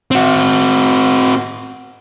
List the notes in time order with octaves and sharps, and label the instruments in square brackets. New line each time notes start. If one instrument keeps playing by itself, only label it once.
[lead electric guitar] C4 F#4